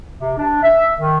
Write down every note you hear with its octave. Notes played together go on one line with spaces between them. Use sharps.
C3
D4
E5
D#3